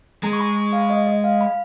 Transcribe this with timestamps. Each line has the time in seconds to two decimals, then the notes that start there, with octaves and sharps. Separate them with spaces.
0.23 G#3 A#5
0.33 C#6
0.39 B5
0.57 C#6
0.73 F5
0.90 D#5
1.07 D#5
1.24 F5
1.41 B5